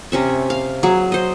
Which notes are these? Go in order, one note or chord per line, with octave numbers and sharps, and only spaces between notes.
C3 C#4 E5
F5
F#3 G#4
C5 D#5